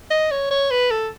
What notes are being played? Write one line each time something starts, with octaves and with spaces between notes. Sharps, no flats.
D#5
C#5
C#5
B4
A4